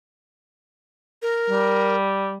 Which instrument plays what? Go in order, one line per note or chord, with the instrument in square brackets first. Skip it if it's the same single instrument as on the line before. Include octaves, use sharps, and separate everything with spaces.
[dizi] A#4
[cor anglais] G3